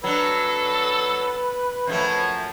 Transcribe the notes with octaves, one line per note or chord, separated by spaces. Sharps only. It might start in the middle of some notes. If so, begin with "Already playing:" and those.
F#3 D4 A4 B4
F#2 F3 A3 C#5